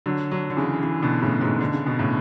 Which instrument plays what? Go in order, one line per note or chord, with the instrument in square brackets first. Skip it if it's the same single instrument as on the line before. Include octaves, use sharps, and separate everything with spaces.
[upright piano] D3 F#3
D3 F#3
D3
C#3 E3
C#3 E3
B2 D3
A2 C#3
G#2 B2
D3
C#3
B2
A2 C#3